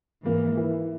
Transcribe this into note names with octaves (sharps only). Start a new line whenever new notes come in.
G#2 E3 G#3 A#3
E3